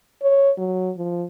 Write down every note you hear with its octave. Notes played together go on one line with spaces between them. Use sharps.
C#5
F#3
F3